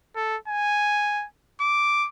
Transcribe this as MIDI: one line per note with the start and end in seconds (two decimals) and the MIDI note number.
0.16 0.37 69
0.48 1.26 80
1.61 2.08 86